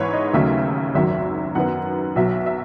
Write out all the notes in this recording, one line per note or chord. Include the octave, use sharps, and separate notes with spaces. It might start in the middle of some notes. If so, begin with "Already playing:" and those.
Already playing: G#2 E3 G#3 B3 E4 B4 C#5
D#5
D#2 C#3 F#3 A3 D#4 E5
G#1 F#2 D#3 F#3 E5
F#2 D#3 F#3 B3 F#5
B1 B2 F#3 E5
E5